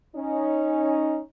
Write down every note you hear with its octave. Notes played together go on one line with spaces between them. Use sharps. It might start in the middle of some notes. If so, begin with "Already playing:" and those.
C#4 D#4